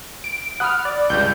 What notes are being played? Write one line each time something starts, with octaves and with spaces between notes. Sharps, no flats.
D7
F#5 B5 D#6 F6 F#6
D5
C#2 G2 G6